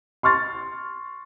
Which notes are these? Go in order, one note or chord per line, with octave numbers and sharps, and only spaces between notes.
C6 C#6 F6 A6